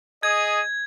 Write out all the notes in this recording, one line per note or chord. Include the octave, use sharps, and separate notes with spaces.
G#4 D#5 G#6